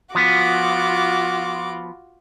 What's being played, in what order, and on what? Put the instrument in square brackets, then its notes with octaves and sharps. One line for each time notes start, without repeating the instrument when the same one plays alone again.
[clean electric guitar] F3 B3 [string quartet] F4 F#4 D6